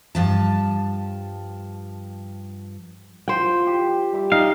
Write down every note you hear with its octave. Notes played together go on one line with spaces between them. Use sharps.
G2 F3 A5
F3 C5 G5
G4
G3 E5 D6
D#4 F5